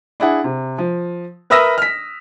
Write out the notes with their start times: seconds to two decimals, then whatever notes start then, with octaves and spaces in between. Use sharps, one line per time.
0.20 D4 E4 G#4 F#5
0.44 C3
0.78 F3
1.50 A#4 B4 E5 D#6 E6 A#6
1.78 F6 B6